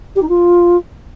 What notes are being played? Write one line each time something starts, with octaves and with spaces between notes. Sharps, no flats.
G4
D#4
F4